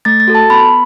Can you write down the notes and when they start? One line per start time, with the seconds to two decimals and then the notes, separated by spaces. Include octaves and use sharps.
0.05 A3 A6
0.20 A6
0.28 F#4 A4
0.35 A5
0.50 B3 B5